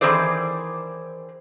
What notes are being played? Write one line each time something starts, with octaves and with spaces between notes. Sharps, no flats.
D#3 E3 C4 G#4 C5 D5